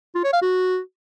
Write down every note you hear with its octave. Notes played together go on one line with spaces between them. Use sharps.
F4
C#5
F5
F#4